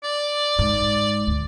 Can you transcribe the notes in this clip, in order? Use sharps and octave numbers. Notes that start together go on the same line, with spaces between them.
D5
G#2
D2 A2